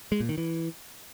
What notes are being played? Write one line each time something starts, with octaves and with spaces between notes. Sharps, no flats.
G#3
A#2
D#3
E3